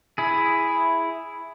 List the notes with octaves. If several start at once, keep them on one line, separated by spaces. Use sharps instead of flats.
E4 G#4